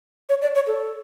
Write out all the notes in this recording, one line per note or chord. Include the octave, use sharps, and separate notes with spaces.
C#5
D5
C#5
A4